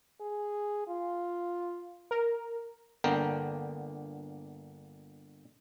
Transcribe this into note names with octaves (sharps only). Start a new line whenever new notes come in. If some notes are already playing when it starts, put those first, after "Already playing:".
G#4
F4
A#4
G1 D3 A#3 B3 A#4 G5